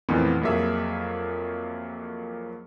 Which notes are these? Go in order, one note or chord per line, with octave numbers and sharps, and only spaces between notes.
F2 A#2 E3 A3 B3 C4
F2 F#3 A#3 G#4 E5